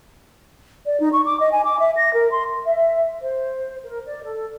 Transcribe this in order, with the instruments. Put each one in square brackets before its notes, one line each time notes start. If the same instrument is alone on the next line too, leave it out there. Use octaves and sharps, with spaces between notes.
[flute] D5
D#4
C#6
D6
D#5
G#5
D6
E5
A#6
A#4
C6
[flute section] E5
C5
A#4
D5
A4